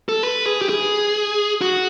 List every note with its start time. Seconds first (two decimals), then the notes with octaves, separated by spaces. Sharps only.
0.09 A4
0.23 B4
0.46 G#4
0.62 G4
0.69 G#4
1.62 F#4